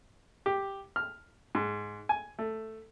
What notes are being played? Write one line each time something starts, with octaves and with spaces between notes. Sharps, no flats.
G4
F6
G#2
G#5
A3